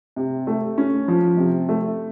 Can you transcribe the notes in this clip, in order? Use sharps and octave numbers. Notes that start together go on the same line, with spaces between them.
C3
A3
C#4
F3
C3
A3